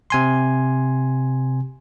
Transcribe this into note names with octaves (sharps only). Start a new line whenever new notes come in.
C3 G#5 C6